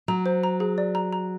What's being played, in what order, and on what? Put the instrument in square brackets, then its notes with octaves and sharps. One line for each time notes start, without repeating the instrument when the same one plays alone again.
[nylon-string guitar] F#3 [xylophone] A#5
[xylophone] C5
A#5
G#4
D5
A#5
A#5